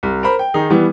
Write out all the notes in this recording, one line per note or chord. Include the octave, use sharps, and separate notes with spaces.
C2
A#4 C5 B5
G5
D#3 D#4 G#4
E3 G3 B3